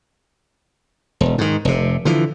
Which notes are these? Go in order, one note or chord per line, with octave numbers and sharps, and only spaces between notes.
E1
G#2 D#3
F1 C3
D3 E3 F3